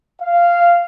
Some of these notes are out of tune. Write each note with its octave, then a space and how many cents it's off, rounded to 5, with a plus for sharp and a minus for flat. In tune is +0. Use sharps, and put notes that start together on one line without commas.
F5 -10